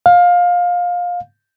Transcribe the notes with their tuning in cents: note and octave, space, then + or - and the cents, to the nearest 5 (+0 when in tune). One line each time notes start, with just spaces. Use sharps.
F5 +20